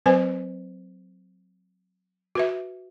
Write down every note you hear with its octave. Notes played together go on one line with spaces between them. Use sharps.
F#3 C4 B4 C5 G#5
F#4 B4 E5